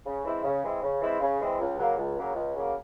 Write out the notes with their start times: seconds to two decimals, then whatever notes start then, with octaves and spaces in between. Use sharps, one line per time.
0.06 C#3
0.25 E3 G#3 C4 E4
0.44 C#3
0.63 E3 G#3 C4 E4
0.83 C#3
1.01 E3 G#3 C4 E4
1.21 C#3
1.39 E3 G#3 C4 E4
1.59 C#2
1.78 C#3 F#3 A#3
1.97 C#2
2.17 C#3 F#3 A#3
2.35 C#2
2.55 C#3 F#3 A#3